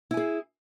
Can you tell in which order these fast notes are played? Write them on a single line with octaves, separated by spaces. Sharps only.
E4 G#5 G#4